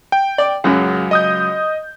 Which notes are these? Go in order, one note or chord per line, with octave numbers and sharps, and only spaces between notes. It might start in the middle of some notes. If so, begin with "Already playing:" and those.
G5
D5
C#2 F#2 C#3 F#3
D#5 D#6 G6